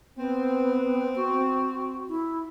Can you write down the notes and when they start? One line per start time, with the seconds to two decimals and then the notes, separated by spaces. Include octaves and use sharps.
0.17 B3 C4
1.16 F#4
2.08 E4